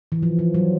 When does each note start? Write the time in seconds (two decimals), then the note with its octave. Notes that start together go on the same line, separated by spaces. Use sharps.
0.12 E3
0.22 F3
0.39 F3
0.54 F#3